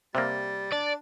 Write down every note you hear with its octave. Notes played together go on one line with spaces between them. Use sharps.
C3 G3 A#3 A6
D4 D5